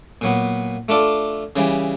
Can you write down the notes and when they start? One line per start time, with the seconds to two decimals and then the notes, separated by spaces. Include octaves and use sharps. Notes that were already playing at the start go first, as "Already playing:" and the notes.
0.21 A#2 F#3 B3
0.89 A3 D4 F4 A4 D5
1.56 C#3 E3 G3